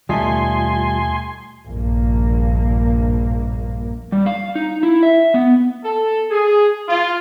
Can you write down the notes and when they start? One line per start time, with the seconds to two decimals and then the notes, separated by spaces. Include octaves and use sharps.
0.09 D#2 B2 G3 A3 D#4 F4 G#5 C6
1.66 A#1 G2 A#3
4.12 G3
4.26 F5
4.55 D#4
4.83 E4
5.03 E5
5.34 B3
5.84 A4
6.30 G#4
6.88 F4